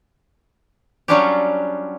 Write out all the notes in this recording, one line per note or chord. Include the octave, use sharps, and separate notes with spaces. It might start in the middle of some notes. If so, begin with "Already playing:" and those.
F#3 G3 C#4 D4 F4 G4